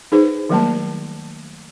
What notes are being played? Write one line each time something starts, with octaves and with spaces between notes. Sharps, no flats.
D#4 G#4 B4 C5
D#3 F#3 G3 A3 A#3 A5